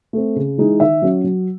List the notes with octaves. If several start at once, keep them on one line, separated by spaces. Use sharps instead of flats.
A3 C4
C#3
E3 G#3 D#4
D#3 E5
F#3 C#4
F#3